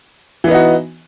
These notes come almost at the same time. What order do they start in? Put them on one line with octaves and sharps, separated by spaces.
E3 B3 D#4 F#4